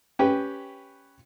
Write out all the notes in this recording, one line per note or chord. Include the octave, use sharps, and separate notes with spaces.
C#4 G4 B4 G5